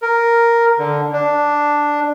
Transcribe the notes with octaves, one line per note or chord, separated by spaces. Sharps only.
A#4
D3
D4